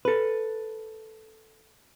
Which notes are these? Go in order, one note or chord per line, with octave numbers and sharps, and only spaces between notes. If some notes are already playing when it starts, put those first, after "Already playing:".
A4 B4